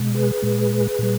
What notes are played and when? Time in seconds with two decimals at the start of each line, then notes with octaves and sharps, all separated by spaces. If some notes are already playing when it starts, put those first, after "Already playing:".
Already playing: B2 G#3
0.14 G#4 B4
0.43 A#2 G#3
0.99 A#2 G3